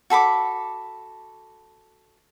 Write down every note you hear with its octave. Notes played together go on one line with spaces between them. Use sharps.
F#4 A4 B5 D6